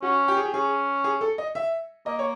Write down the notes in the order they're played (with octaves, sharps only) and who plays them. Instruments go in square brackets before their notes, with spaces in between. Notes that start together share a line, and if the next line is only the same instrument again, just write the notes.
[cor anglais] C#4 [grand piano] F#4
[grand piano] G4
G#4
G4
[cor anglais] C#4 [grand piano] G#4
[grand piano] G#4
A4
D#5
E5
[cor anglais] A#3 [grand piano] D#5
[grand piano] C#5